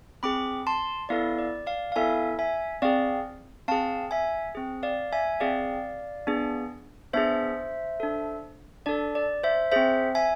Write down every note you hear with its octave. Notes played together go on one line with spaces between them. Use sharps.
C4 G#4 B5 D6
A5 C6
B3 E4 A4 D5 F5
D5
D5 F5
F5
B3 E4 A4 E5 G#5
E5 G#5
C4 G#4 D5 F5
C4 G#4 F5 A5
E5 G#5
C4 G#4
D5 F5
E5 G#5
C4 G#4 D5 F5
B3 D4 G#4
B3 D4 G#4 C5 E5
D4 A4
D4 A4 D5
D5
C5 E5
C4 G#4 C5 E5
E5 G#5